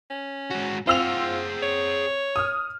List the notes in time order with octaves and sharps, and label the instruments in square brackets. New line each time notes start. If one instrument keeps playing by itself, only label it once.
[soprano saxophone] C#4
[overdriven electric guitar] G#2 F#4
[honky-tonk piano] C4 E6 F7 [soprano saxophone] F4 [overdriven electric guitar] G#4 F#5
[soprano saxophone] C#5
[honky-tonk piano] D#6 F6